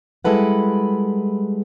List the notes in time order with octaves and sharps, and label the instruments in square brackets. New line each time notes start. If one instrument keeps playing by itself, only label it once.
[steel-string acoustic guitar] G3 G#3 E4 A4 B4 F#5